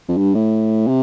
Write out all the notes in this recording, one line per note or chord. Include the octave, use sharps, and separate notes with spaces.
F2
G2
A2
C3